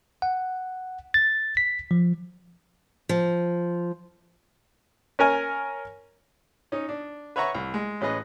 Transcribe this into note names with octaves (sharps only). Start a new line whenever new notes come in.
F#5
A6
B6
F3
F3
C#4 A#4 G#5
C#4 D#4
D4
B4 C#5 E5 F#5 A#5 C#6
C2
G#3
A1 C#4 G#4 B4 D#5